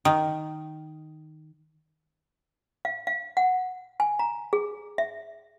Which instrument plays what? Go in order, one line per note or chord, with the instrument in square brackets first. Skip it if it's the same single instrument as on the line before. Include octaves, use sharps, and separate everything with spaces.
[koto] D#3
[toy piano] F5
F5
F#5
G#5
A#5
G#4
E5